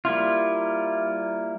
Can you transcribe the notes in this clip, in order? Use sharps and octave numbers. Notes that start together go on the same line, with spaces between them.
G3 A#3 E4 F4